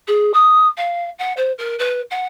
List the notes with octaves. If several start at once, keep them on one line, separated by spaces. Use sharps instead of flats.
G#4
D#6
F5
F#5
C5
A#4
B4
F#5